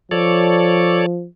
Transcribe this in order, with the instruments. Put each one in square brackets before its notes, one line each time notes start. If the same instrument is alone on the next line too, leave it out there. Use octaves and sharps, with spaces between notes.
[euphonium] F3 [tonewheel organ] A4 C#5 D5